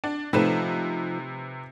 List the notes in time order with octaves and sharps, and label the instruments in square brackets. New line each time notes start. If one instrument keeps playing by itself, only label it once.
[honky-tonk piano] D4
[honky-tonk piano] C3 B4 E7 [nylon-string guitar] F3 A3 D#4